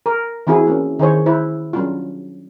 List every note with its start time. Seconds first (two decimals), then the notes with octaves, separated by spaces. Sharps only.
0.06 A#4
0.47 E3 C4 E4 F#4 G#4
0.67 A#3 C#4
0.99 D#3 E4 G#4 C5 C#5
1.26 E4 B4 C5
1.73 F#3 G3 C#4 D4 F4